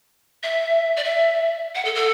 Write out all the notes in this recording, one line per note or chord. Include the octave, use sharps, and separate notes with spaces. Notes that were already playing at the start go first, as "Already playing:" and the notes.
E5
D5
E5
F#5
A4
A4